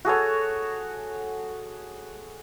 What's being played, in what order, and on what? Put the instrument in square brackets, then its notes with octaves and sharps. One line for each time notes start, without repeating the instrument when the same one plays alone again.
[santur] F#4 G#4 A4 C#5